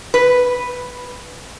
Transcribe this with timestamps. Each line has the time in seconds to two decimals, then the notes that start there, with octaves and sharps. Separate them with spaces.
0.14 B4